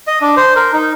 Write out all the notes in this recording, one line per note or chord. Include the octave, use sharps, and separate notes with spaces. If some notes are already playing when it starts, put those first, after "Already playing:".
D#5
D4
C5
A#4
D#4